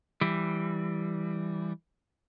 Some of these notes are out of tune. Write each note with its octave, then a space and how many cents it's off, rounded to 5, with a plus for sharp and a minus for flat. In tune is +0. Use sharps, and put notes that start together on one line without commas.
E3 +0 G3 +0